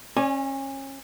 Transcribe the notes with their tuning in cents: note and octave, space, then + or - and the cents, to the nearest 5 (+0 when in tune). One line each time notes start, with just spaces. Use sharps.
C#4 -30 D5 +0 G#5 +0